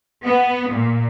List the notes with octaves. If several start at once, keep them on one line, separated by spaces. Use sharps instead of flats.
B3
A#2